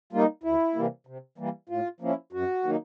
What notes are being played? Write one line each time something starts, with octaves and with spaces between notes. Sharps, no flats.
G3 A#3 D#4 F4
D2 E4
C3 E3 G3 A#3
C3
E3 G3 A#3
A2 F4
F3 A#3 C#4 E4
F#2 F#4
D#3 F#3 A#3 D#4